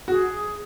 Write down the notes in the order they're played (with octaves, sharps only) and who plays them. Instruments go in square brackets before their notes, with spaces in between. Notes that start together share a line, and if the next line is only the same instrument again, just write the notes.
[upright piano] F#4 [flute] G#4